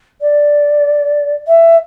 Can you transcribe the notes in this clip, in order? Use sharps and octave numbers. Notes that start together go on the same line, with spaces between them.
D5
E5